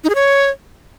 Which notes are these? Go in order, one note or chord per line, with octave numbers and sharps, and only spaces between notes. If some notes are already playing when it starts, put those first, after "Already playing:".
D#4
G#4
C#5